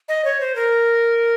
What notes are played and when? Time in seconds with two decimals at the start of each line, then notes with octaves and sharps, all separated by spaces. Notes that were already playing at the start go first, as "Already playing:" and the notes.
0.09 D#5
0.25 C#5
0.41 C5
0.56 A#4